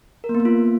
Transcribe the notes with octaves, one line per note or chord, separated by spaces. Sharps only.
A#4
A#3
B3
A#3
F4